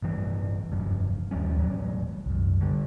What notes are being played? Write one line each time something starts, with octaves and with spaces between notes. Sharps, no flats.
A1 G2 E3 G3
F1 G2 E3 F3
D#2 F3 G3 C#4
E1 A1 F#3 G3
C2 F#2
D3 G3